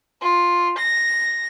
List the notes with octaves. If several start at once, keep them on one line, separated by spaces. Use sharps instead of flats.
F4
A#6